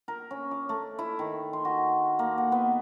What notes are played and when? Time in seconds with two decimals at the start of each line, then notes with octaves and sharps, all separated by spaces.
0.08 A#4
0.31 C#4
0.51 D6
0.69 A3
0.99 E4
1.19 D#3
1.53 C6
1.65 F#4
2.19 A#3
2.38 F#5
2.52 B3